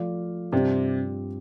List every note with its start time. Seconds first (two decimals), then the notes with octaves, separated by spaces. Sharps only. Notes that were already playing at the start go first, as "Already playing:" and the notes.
Already playing: F3 A3 F4 D5 F5
0.52 G2 C3 G3 C4 F4 D5